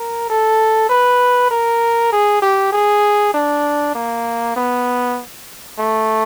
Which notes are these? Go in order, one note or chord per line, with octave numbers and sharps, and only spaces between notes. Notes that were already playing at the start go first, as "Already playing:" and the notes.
Already playing: A#4
A4
B4
A#4
G#4
G4
G#4
D4
A#3
B3
A3